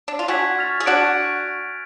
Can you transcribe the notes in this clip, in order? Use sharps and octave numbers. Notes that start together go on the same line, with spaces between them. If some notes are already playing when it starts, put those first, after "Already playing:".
D4
F4
D4 F#4 G#5 C#6 G#6 B6
F6 A6 F7
G#4
D4 F#4 F#6 A6 D7